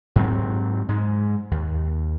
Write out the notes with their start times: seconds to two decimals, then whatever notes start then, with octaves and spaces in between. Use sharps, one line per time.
0.16 G#2 F#3 C4
0.89 G#2 G#3
1.51 D#2